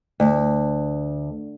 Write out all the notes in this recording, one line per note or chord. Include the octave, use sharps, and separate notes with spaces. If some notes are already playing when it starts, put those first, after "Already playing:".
D2